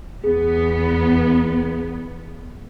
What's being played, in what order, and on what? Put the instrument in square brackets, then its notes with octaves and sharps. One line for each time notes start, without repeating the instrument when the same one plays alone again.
[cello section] E2 B3 [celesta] G#4